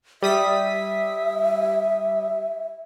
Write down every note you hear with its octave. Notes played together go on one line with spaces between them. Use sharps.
G3 E5 D#6 B6